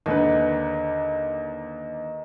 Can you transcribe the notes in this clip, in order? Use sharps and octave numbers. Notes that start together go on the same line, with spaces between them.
D#2 D3 D#4 B4